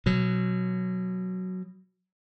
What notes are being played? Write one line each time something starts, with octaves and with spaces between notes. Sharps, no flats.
B2 F#3